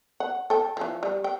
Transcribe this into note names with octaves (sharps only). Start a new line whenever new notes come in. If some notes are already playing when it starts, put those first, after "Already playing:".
F#5
A4 G5
E3 F3
G3
G5